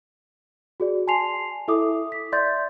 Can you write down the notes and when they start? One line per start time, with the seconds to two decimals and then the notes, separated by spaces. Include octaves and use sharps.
0.80 F#4 G#4 D5
1.07 G#5 A5 C6 C7 F7
1.68 E4 A4 E5 D6 D#6
2.12 B6
2.32 D5 E5 C6 G6 A6